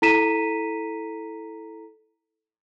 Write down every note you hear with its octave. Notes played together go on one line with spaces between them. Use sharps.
E4 A4 A#5 B6 D#7 E7